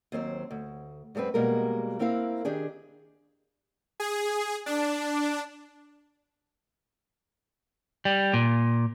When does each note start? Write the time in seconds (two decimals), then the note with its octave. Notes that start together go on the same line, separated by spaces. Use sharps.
0.12 D#2 F#3 C4 C5
0.51 D2
1.15 F#2 G#3 A3 C4 B4
1.34 B2 G3 G#3 A#3 F#4 A#4
1.99 A#3 C4 E4 A#4 F5
2.45 D#3 D4 G4 G#4
4.00 G#4
4.66 D4
8.05 G3
8.34 A#2